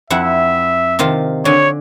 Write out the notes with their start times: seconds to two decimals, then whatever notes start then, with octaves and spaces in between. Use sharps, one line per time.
0.10 F2 E4 E5 F#5
0.99 C3 D#3 F4
1.45 D3 C#5 G#5